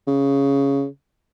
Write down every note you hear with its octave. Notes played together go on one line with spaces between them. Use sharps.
C#3